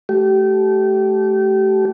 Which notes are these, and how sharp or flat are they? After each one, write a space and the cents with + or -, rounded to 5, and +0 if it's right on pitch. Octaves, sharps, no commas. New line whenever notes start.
A3 -30 G4 -30